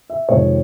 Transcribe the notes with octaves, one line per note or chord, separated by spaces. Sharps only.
E5
F2 C3 D#3 G#3 C#5